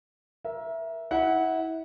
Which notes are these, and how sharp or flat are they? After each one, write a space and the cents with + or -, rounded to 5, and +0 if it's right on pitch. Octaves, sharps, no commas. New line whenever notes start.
A#4 +25 E5 +0
E4 -30 F#5 +0